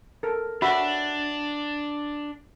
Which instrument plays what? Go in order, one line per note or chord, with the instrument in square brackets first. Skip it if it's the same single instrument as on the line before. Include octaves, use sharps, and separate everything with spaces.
[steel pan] A4 A#4
[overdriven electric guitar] D4 [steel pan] F#4 E5 B5